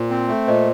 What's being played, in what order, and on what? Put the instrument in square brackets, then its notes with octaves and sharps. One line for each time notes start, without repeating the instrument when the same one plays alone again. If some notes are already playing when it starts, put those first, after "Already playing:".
Already playing: [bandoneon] A#2 [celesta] C5
[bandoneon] C4
A3
[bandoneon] A#2 [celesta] C5 D#5